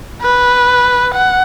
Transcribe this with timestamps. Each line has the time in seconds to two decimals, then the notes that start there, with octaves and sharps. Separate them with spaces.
0.22 B4
1.14 F#5